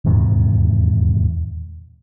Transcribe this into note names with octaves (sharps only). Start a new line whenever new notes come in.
D#1 E2 G#2 C3